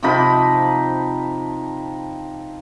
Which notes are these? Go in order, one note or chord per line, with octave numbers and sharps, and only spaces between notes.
C3 F3 D#4 B5